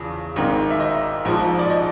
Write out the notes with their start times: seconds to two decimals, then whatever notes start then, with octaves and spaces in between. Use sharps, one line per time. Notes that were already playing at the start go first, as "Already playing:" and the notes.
Already playing: E2 C#3 F3
0.36 G#1 G#2 D#3
0.70 E5
0.80 D#5
1.25 A#1 G#2 F3
1.59 D5
1.70 D#5